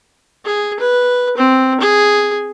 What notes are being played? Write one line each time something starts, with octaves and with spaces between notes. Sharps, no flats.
G#4
B4
C4
G#4